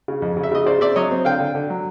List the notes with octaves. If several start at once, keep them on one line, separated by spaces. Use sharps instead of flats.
C#3
F2
C#3
E5
C#3 D#5
C#3 C5 D5
C4 D5 E5
F#3 C#5 D#5
C4
D3 F5 G5
D3
D3
F#3